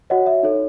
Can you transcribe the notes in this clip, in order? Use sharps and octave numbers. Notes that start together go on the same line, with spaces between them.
F#4 C#5 D#5 F#5
E5
D#4 A4 C#5